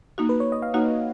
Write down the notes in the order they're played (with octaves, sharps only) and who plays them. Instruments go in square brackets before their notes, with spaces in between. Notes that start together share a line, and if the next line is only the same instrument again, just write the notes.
[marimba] A#3 D#4 F#4
[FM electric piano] B4
C#5
D#5
F5
[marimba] A#3 D#4 F#4 [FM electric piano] F#5